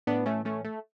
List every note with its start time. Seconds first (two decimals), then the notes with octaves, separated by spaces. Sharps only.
0.07 A2 E3 B3 D4
0.26 A3 C#4
0.45 A3 C#4
0.65 A3